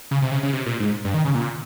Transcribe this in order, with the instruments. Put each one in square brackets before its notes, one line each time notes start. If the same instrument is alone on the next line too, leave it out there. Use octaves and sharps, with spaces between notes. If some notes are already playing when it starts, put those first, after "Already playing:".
[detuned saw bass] C#3
C3
C#3
C#3
C3
A#2
G#2
G2
D#3
C#3
A#2